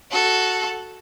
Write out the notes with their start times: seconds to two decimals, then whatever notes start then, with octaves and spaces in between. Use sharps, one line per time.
0.11 F#4 A4